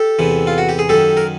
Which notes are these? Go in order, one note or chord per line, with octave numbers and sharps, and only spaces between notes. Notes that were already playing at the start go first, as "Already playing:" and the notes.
Already playing: G4 A4
E2 C3 E3
F4
F#4
G4
G#4
F#2 D#3 G4 A4
A#4